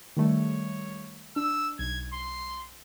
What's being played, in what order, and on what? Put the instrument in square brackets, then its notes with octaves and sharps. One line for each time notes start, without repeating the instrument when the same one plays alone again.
[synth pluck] D#3 G3 A3 [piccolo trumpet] C#5
[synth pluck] D4 [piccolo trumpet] E6
[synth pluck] B1 [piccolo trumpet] G#6
[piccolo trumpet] C6